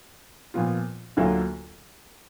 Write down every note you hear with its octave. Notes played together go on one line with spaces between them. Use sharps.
A#2 F3 B3 F4
D2 D3 F#3 A#3 F4